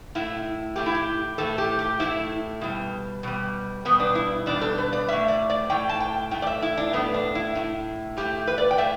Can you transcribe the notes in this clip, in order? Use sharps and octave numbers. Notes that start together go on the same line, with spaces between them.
A2 A3 E4
A2 A3 G4
E4
G4
A2 A3 A4
G4
G4
A2 A3 E4
B2 G3
B2 G3
B2 G3 B3
D4
E4
B2 G3 D4
A4
B4
D5
A2 A3 E5
D5
D5
A2 A3 G5
A5
G5
A2 A3 G5
D5
E5
E4
D4
A2 A3 B3
D4
E4
A2 A3
A2 A3 G4
B4
D5
G5
A2 A3 E5